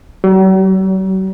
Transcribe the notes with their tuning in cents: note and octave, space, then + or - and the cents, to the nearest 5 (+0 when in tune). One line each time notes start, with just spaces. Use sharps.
F#3 +45